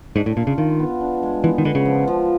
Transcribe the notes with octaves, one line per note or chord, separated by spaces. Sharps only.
G#2 D4
A2
A#2 F4
C#3
D#3 F4
B3
D4
G#3
E3 B3
D#3
D3 B3
C#3
F3
F3